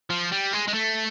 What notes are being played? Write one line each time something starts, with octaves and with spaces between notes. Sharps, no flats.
F3
G3
G#3
G#3
A3